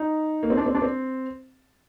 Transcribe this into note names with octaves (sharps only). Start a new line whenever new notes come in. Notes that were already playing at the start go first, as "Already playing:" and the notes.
Already playing: D#4
A#3
C4
D4
C4
D4
C4